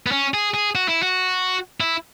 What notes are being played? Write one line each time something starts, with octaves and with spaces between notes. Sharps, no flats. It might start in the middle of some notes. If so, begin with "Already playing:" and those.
B3
C#4
G#4
G#4
F#4
E4
F#4
E4